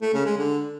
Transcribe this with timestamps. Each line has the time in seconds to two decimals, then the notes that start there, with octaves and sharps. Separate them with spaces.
0.02 A3
0.13 C#3
0.25 G#3
0.37 D3